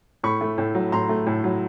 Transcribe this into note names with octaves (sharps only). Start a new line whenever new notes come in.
A2 B5 C#6
A3
A2
F#3
A2 A#5 C6
A3
A2
F#3